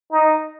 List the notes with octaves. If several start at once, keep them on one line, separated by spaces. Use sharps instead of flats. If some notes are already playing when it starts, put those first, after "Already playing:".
D#4